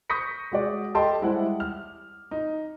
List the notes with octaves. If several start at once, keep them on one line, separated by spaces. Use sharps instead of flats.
C#6 D#6 G6 A#6 B6 C#7
G#3 F#4 D5
G4 A4 D#5 G5 A5 C6
G3 G#3 E4 G#4 C5 F#5
F6
D#4